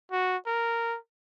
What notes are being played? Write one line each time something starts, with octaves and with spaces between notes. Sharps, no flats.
F#4
A#4